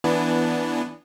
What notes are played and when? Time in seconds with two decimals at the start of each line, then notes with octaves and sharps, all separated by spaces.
0.04 E3 B3 D4